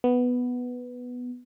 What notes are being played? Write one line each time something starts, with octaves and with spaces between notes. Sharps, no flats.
B3